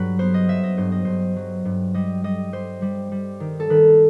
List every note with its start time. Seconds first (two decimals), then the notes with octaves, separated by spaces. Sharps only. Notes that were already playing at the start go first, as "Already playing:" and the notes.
Already playing: G2 F#3 B4
0.19 B3 C5
0.34 D#5
0.49 F#3 E5
0.64 D#5
0.77 G2 C5
0.92 D#5
1.05 G2 C5
1.36 F#3
1.65 G2
1.94 G3 D#5
2.24 G3 D#5
2.53 G3 C5
2.82 G3
3.12 G3
3.40 D#3
3.60 A4
3.70 D#3 B4